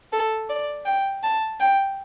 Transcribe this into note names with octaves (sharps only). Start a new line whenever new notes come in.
A4
D5
G5
A5
G5